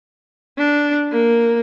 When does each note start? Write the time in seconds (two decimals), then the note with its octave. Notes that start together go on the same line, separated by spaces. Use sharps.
0.58 D4
1.12 A#3